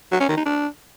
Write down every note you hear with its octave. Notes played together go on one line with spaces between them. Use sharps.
F#3
C#4
D#3
D#4
D4